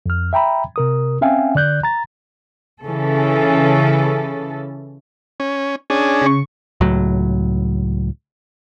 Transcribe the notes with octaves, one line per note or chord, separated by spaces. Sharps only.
F2 F6
E5 G5 A#5 B5
C3 A#4 D#6
C4 C#4 E5 F5 G5 G#5
D3 D5 F#6 G6
A#5 A6
C#3 E3 C#4 A4
C#4
C#4 D4 G#4
C#3 C#6
C#2 A2 F#3